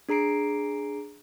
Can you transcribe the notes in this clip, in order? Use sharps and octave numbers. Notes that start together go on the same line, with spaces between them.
D4 G#4 A#5 C7 D7